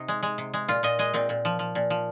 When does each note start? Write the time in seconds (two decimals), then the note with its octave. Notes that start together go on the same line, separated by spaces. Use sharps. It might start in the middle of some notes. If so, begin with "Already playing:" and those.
Already playing: C3 D#4
0.08 G#3
0.23 G#3
0.38 C3
0.54 G#3
0.68 A#2 F4
0.83 A#2 D#5
0.99 G#3 D#5
1.14 A#2 C4
1.29 A#2
1.45 F3
1.59 F3
1.75 A#2
1.90 F3